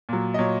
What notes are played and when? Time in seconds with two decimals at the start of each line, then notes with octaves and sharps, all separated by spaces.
0.09 A#2 F#3
0.34 D#5
0.39 A#2 F#3 C#5